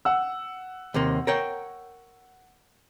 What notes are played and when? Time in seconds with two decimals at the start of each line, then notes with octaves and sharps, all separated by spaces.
0.05 F#5 E6
0.94 D#2 C3 A#3
1.27 A#4 C#5 G5